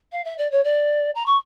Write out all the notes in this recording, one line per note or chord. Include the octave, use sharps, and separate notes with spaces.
F5
E5
D5
C#5
D5
A#5
C#6